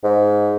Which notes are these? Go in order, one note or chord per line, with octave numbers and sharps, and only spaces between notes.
G#2